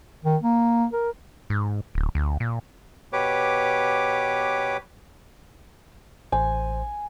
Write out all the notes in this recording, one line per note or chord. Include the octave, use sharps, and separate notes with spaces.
D#3
A#3
A#4
G#2
D1
D2
A#2
B2 G4 B4 C#5 D6
A1 C5 G#5